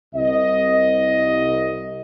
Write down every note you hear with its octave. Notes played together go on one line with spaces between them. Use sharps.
C2 D#5